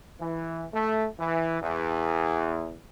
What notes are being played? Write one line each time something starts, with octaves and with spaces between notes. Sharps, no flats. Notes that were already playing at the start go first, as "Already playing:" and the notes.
E3
A3
E3
E2